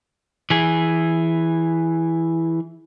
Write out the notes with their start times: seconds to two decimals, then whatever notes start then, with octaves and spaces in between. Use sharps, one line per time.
0.50 E3 G#4